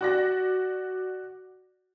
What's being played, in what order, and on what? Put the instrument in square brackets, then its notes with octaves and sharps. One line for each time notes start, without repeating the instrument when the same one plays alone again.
[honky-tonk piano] F#4 D5 A#6